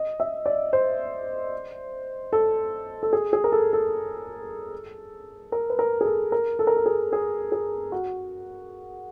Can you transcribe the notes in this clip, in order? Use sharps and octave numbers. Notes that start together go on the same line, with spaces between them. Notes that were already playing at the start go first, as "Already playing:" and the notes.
Already playing: D#5
E5
D5
C5
A4
A4
G#4
G#4
A#4
A4
A4
A#4
B4
A#4
G#4
A4
A#4
A4
A#4
A4
G#4
G#4
G#4
F#4